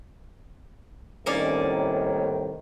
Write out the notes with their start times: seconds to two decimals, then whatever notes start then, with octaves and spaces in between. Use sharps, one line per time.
1.26 C2 A2 D#3 A#3 C#4 D5